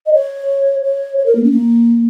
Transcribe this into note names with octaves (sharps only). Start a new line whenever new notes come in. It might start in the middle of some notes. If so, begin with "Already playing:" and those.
D#5
C#5
C#5
C#5
A#4
A#3
C#4
A#3